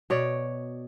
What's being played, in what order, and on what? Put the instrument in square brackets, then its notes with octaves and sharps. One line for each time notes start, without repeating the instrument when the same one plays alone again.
[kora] B2 C#5 D5